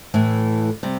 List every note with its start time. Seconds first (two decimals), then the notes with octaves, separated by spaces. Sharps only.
0.14 A2 E3 A3
0.83 C3 G3